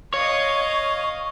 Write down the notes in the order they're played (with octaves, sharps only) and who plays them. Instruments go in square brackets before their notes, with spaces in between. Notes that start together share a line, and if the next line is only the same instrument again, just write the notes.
[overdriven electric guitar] C#5 [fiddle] D#5 F5